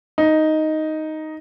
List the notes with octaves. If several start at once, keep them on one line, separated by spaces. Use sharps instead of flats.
D#4